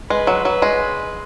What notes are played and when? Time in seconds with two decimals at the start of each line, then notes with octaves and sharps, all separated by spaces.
0.10 G#3 B4
0.27 F#3
0.45 F#3
0.62 G#3